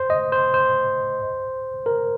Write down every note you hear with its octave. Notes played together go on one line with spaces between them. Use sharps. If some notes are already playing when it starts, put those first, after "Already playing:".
Already playing: C5
D#5
C5
C5
A#4